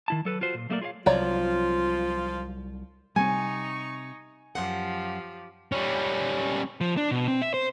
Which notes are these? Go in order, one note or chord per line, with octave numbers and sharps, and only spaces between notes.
D#3 E4 A5
F#3 A4 B4
F4 F#4 C5
A#2
F#3 A3 A#3 G4 A#4 D5
F4 G#4 C#5 D5 F5
C2 F3 F#3 F4 C#5 D5 A#5
C3 G3 A#3 C4 D#4 G#5 C#6
F#2 F3 G4 F5 F#5
G3 C#4
F3
D4
B2
C4
E5
C5